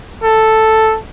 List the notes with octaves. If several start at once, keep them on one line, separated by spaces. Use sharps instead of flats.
A4